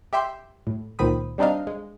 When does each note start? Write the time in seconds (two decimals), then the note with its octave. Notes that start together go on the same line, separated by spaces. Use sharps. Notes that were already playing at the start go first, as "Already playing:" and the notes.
0.13 G4 E5 G5 C6
0.67 A2
0.99 C#2 A#2 D#3 C4 B5 D#6
1.38 G3 C4 D4 D#4 D#5 F5
1.67 G#3